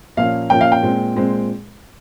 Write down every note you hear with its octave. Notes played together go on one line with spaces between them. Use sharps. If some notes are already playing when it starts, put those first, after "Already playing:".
A#2 F3 A#3 C#4 F5
A#2 F3 A#3 C#4 G5
F5
G5
A#2 G#3 C4
A#2 G#3 C4